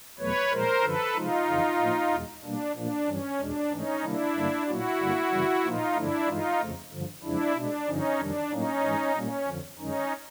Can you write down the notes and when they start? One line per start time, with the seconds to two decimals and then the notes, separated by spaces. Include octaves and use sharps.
0.19 E2 B2 F#3 A3 B4 C#5
0.51 A#2 F3 G#3 A#4 C5
0.83 F#2 D3 F3 A4 B4
1.15 C3 F3 G#3 D#4 F4
1.48 F2 C#3 E3
1.79 A2 F3 A#3
2.12 E2 B2 G#3
2.44 B2 G3 A#3 D4
2.75 A#2 F3 A#3 D4
3.07 G2 E3 G3 C#4
3.39 E2 B2 G#3 D4
3.71 G#2 E3 A3 C#4 D#4
4.03 C3 D#3 G3 A#3 D4 E4
4.35 G2 D3 G3 A#3
4.67 A#2 F#3 A#3 E4 F#4
5.00 G2 D3 G3 A#3
5.31 F#2 C#3 E3 G3
5.64 A#2 F3 A#3 D#4 F4
5.95 G2 D3 F3 A3 D4 E4
6.27 G2 E3 G#3 D#4 F4
6.59 F2 C#3 F3 A3
6.92 G2 D3 F3
7.23 F2 C#3 F3 G#3 D4 E4
7.55 B2 G#3 D4
7.87 G2 D3 F3 C#4 D#4
8.19 F2 C3 D#3 G3 D4
8.51 A2 F#3 A#3 C#4 D#4
8.83 G#2 E3 G#3
9.15 A#2 G3 A#3 C#4
9.47 F2 D3 F3
9.79 F#2 D#3 G#3 C#4 D#4